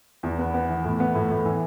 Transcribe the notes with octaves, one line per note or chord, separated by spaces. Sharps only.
E2
B3
B3
E3
A2
B3
A2
A2
E3